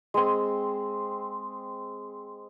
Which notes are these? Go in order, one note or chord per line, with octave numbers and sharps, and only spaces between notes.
G#3 C4